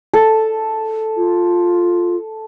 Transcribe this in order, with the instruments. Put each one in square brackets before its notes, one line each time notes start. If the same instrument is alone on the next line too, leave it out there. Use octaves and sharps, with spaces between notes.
[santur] A4
[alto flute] F4